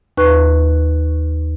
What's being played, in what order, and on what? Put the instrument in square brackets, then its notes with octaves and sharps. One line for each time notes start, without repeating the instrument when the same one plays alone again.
[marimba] D#2 B4 C#6 F#6